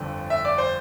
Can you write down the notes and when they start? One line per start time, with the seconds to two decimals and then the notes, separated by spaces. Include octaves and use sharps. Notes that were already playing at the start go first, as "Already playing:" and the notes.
Already playing: G1 F2 D3
0.30 E5
0.45 D5
0.58 C5